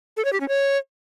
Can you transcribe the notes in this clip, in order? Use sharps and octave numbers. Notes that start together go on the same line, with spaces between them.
A4
C#5
G4
C#4
C#5